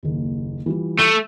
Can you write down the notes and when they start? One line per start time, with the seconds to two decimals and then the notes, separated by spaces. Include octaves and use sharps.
0.03 F#1 D#2
0.66 E3 G3 F4
0.99 A3